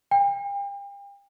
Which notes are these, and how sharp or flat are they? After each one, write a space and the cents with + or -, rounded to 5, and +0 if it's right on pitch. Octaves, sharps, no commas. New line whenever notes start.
G5 +40